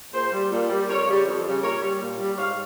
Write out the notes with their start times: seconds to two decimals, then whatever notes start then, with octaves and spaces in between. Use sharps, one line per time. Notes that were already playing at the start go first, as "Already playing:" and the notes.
0.13 A#2 G#4 C5
0.32 G3
0.51 A#2
0.70 G3
0.88 F2 A#4 C#5
1.07 C#3 G3
1.26 F2
1.44 C#3 G3
1.63 A#2 A#4 C#5
1.82 G3
2.01 A#2
2.20 G3
2.38 G#2 C#5 F5